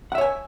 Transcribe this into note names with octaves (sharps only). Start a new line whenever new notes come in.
C#5 E5 F#5 G#5